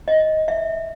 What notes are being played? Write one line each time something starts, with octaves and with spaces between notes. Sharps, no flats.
D#5
E5